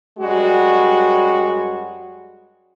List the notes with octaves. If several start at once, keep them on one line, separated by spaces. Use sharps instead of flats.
F#2 G3 G#3 F#4